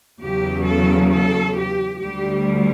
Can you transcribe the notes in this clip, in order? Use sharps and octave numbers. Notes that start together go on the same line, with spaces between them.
E2 C#3 F#3 G4
A4
A4
G4
D2 D3 G3 G4